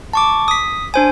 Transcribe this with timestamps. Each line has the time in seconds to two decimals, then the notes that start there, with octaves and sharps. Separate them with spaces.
0.13 A5 C#6 D6
0.48 D#6 B6
0.94 D4 C5 G#5